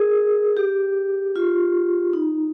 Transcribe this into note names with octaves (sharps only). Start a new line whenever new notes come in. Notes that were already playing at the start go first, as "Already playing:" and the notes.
Already playing: G#4 A#4
G4
F4
D#4